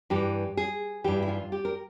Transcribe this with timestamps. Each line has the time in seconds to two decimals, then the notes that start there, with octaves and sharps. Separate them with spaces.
0.10 G2 E3 G4
0.57 G#4
1.04 G2 E3 G4
1.22 E4
1.28 F4
1.52 G4
1.65 A#4